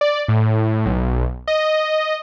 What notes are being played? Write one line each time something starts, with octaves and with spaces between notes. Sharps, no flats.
D5
A2
B1
D#5